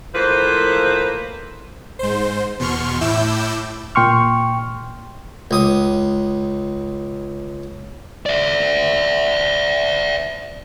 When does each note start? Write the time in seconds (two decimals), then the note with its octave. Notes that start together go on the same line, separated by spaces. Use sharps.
0.14 A2 F3 A#3 B4 C5
1.99 G#2 C5
2.59 E2 B2 C6 C#6 F6
3.01 A2 E4 D6 E6 G6
3.95 A#2 G5 C6 C#6 F6
5.51 C#2 D#6
8.26 D5 E5